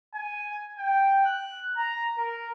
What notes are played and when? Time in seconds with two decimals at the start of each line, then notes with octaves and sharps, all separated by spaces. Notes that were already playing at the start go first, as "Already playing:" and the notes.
0.15 G#5
0.79 G5
1.25 F#6
1.77 A#5
2.18 A#4